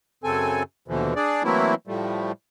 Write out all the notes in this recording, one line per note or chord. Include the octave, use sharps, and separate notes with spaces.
F#2 C#3 C4 A4 G#5
D#2 B2 D3 E3 F3
D4 G#4 D5
E3 F#3 A3 A#3 C4 E4
A2 F3 G3 A3